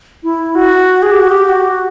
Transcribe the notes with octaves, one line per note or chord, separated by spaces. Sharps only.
E4
F#4
G#4
G4
F#4
G4
F#4